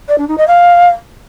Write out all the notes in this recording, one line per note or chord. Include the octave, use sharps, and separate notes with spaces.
D5
D4
D#4
D#5
F5